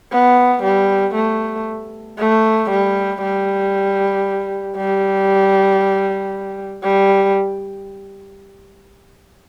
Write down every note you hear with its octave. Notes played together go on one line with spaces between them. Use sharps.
B3
G3
A3
A3
G3
G3
G3
G3